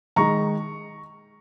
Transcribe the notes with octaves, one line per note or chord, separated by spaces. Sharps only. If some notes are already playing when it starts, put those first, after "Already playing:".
D#3 G#3 D#4 A#5 C#6